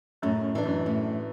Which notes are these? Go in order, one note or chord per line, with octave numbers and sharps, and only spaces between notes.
F#2 A2
E3 D4
F#2
A2